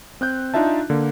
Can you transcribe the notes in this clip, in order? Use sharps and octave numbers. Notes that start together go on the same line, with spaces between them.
C4 F#6 G6
D4 D#4 F4 E5 A5
D3 A#3